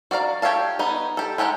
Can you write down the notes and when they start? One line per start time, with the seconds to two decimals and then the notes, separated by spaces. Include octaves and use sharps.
0.11 F#4 D5 F5 A#5
0.42 G4 C#5 E5 F5 A5
0.79 B3 D#4 D#5
1.17 G4 A4
1.38 G#3 G4 A4 F#5 A#5